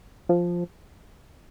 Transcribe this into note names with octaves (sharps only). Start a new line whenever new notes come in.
F3